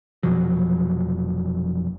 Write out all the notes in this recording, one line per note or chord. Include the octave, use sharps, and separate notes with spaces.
F1 B2 F3 F#3